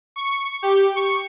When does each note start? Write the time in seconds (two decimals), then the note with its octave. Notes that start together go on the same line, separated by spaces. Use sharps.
0.16 C#6
0.62 G4
0.96 C#6